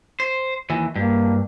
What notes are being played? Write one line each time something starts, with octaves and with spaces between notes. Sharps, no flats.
C5
D#2 E3
G2 A#3